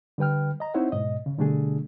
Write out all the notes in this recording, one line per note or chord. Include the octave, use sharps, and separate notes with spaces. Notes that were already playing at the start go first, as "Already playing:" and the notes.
D3 G3 B4 G5 F6
D#5 A#5
C4 D#4 E4 C5 C#5 F#5
G#2 B2 D#5
C#3
B2 D3 G3 A3 D4 G#4